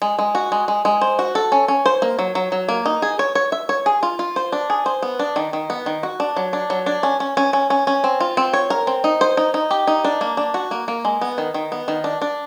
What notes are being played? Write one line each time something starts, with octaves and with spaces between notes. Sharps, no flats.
G#3
G#3
F#4
G#3
G#3
G#3
C5
F#4
A4
C#4
C#4
C5
A#3
F#3
F#3
F#3
A#3
D#4
G#4
C#5
C#5
E5
C#5
G#4
F4
F4
C5
D4
G#4
C5
B3
D4
D#3
D#3
B3
D#3
F#4
D4
F#3
D4
F#3
D4
C#4
C#4
C#4
C#4
C#4
C#4
C4
F4
C4
C#5
A#4
C4
D#4
C5
D#4
D#4
G4
D#4
D4
A#3
D4
F#4
A#3
A#3
G#3
B3
D#3
D#3
B3
D#3
D4
D4